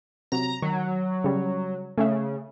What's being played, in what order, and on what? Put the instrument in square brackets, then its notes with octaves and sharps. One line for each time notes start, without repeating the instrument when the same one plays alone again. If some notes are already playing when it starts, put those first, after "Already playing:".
[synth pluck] C3 F#3 [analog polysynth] A#5
[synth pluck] D#3 [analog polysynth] F#3
[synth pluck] C#3 G3
[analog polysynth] C#3 [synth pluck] A3 C#4 E5